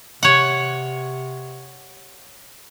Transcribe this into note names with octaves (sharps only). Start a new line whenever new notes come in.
C3 C#5 F#5